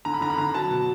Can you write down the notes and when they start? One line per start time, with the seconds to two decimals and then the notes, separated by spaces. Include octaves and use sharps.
0.05 D3 A#5
0.14 B5
0.21 D3 A#5
0.30 B5
0.38 D3 A#5
0.54 F#3 A5
0.71 B2